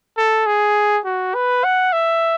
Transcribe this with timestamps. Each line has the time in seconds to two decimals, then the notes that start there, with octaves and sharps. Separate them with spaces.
0.17 A4
0.47 G#4
1.05 F#4
1.35 B4
1.64 F#5
1.92 E5